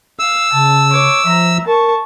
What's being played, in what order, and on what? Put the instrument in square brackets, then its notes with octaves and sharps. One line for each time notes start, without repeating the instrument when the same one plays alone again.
[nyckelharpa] F5 [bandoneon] E6
[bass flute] C#3 [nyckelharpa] A5
[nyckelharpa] C#5 D6
[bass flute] F3 [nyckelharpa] E5 A#5
[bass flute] A#4 [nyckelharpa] A5 C#6